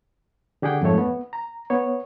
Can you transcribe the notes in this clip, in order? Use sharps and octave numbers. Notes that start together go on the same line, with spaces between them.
D3 G4 G#4 F#5 G5
F2 G#2 A3 C#5
B3
A#5
B3 C#5